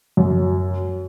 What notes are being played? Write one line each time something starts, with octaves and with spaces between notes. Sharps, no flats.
F#2